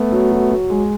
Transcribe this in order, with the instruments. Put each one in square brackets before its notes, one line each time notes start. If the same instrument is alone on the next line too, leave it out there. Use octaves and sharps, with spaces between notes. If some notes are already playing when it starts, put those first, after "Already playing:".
Already playing: [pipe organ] A3 B3
[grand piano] F#3
F#3
F#3
G#3